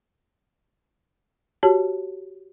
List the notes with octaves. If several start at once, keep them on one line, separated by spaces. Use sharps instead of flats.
F#4 G4 C#5 A5